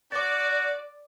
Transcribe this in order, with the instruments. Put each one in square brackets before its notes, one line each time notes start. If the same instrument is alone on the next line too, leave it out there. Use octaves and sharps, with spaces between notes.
[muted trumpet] F#4 [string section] D5 [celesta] D6 A6